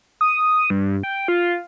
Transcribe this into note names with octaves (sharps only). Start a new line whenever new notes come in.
D#6
G2
G5
F4